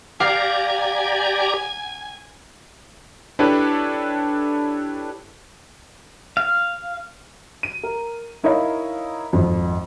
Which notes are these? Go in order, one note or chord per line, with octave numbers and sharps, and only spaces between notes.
G4 D5 F5 G#5 A#5
D4 E4 G4 A4 B4 C#5
F5
D#7
A#4
D#4 E4 A#4 C#5 D#5 F5
G#1 F2